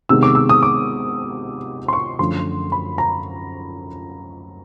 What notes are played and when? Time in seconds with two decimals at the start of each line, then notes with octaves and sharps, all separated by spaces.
0.09 C3 D#3 G#3 B3 E6
0.23 D6
0.35 E6
0.49 D#6
0.63 D6
1.88 C6
1.93 C#6
2.19 F#2 D3 F3 A3 C6
2.72 B5
2.98 A#5